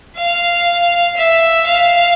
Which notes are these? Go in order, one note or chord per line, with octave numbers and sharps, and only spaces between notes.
F5
E5
F5